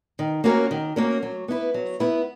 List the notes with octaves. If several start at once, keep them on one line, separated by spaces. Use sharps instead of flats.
D#3
A#3 C#4 F#4 A#4
D#3
A#3 C#4 F#4 A#4
F#3
B3 E4 B4
F#3
B3 E4 B4